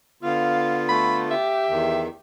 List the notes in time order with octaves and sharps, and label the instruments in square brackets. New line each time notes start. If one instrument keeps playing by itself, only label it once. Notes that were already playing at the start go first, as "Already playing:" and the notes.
[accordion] D3 B3 F4 [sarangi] F5
[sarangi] A3 [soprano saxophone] B5
[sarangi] G4 [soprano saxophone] E5
[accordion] E2 D#3